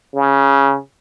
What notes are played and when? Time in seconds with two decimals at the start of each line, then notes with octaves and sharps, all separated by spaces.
0.15 C#3